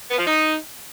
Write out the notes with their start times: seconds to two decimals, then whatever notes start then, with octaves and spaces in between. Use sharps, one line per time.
0.10 B3
0.18 F3
0.26 D#4